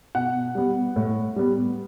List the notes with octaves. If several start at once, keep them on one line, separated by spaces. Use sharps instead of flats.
B2 F#5
G3 B3
A2
G3 B3